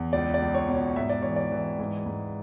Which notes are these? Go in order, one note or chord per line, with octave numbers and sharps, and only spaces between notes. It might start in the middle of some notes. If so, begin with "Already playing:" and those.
Already playing: E2
C#2 D5
D5
C#2
C#5
B2
C#5
G#2 E5
D5
E3 C#5
D5
E3
G#2
G#2